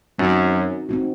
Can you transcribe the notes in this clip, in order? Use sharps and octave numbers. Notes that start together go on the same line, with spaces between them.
F#2 C4 D#4 F#4
C4 D#4 F#4